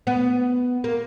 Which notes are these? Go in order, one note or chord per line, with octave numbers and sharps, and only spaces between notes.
B3
A#3